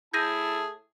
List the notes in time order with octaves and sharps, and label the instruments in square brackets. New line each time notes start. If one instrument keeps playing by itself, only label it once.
[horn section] A2 A3 A5 [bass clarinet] E4 [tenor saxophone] G#4 [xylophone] G6 A#6 D#7